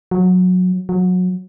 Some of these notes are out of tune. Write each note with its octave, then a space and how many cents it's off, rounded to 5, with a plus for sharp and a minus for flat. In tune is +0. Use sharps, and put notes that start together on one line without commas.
F#3 -20
F#3 -25